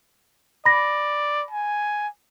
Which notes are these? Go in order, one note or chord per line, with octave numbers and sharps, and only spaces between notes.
D5 B5 A#6
G#5